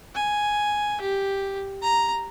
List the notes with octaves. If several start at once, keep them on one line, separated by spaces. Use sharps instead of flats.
G#5
G4
A#5